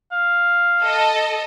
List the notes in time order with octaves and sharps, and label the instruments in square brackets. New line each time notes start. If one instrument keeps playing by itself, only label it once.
[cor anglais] F5
[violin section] A4 D#5